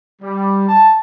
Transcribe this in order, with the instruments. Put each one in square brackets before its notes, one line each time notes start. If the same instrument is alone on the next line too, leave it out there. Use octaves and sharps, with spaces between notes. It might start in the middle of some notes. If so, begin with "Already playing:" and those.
[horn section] G3
A5